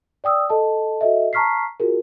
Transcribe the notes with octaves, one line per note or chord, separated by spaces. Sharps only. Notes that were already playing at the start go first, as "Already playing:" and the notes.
D5 G5 D#6 E6
A4 D#5 A5
F#4 A4 D#5 E5
A5 A#5 C#6 F6 B6 C7
F4 F#4 G#4 A#4